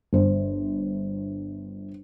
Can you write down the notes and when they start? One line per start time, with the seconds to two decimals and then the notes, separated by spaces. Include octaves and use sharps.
0.13 G1 C5